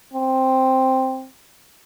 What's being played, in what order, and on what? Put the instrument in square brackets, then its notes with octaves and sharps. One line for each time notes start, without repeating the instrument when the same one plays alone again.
[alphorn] C4